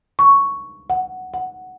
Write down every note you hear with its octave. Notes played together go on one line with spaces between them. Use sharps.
C#6
F#5
F#5